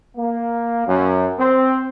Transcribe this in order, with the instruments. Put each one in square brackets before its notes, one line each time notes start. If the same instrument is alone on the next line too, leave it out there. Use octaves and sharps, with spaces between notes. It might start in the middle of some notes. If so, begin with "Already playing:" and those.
[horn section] A#3
F#2
C4